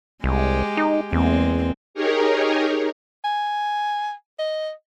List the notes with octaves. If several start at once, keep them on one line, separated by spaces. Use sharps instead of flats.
C2 G#3 G4
D#4
E2 G#3 A#3 C4
D#4 G4 G#4 A#4 C#5
G#5
D#5